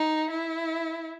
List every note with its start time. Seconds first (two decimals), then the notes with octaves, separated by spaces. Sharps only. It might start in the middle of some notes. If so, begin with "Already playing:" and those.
Already playing: D#4
0.30 E4